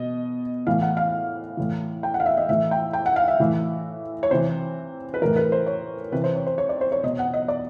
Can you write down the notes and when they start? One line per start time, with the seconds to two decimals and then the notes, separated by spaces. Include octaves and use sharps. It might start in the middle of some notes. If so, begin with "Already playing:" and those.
Already playing: B2 D#5
0.67 A2 E3 F5
0.82 F#5
0.97 F5
1.57 A2 E3
2.03 G5
2.14 F#5
2.20 F5
2.26 E5
2.37 D#5
2.49 A2 E3 E5
2.71 G5
2.93 G5
3.06 F#5
3.16 F5
3.28 E5
3.40 A2 E3
4.23 C#5
4.31 C3 E3 C5
5.14 B4
5.22 A2 E3 A#4
5.36 B4
5.52 C5
5.66 C#5
6.12 C3 E3 B4
6.24 C5
6.35 C#5
6.46 C5
6.58 C#5
6.69 D5
6.81 C5
6.92 C#5
7.03 B2 D#5
7.19 F#5
7.34 D#5
7.48 D5